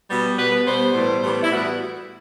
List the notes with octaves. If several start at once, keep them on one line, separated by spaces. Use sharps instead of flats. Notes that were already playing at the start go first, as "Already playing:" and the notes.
B2 G3 B3
B2 G3 B3 B4
B4
B2 G3 B3 C5
A2 E3 G3 B3
A2 E3 G3 B3
E4
A2 E3 G3 B3 F#4